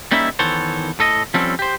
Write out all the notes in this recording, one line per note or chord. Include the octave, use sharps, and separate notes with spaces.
G3 A#3 C#4 D#4 E4 E5
D#3 E3 B3 A4 C5 C#5
A2 A4 D#5
F3 G3 C4 C#4 A4
G4 C5